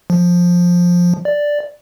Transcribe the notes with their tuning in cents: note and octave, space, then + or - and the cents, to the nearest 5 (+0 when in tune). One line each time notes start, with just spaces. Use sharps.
F3 +10
D5 +0